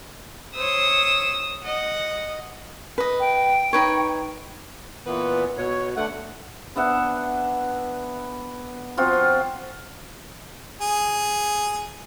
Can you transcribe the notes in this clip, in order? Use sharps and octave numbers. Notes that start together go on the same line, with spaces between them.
C5 C#5 D#6 E6
D#5 F#5
B4 D#5
G5
D#4 B4 C#5
A#2 E3 B3 B4
B2 C#5
D3 A3 F#5
B3 D4 E5 F#5
F3 C4 F4 F#4
G#4